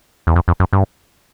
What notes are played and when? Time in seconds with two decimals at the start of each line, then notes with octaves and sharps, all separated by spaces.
0.27 E2
0.36 F2
0.48 F2
0.60 F#2
0.73 G2